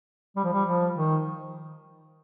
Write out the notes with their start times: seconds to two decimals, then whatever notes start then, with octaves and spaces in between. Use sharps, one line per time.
0.36 G3
0.44 F3
0.53 G3
0.65 F3
0.94 D#3